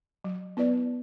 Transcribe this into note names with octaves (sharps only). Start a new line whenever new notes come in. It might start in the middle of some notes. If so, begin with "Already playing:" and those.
F#3
B3 E4 B4 D5